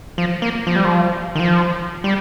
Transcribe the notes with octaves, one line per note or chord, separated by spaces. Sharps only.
F3
A#3
F3
G3
F3
D#3
F3
G3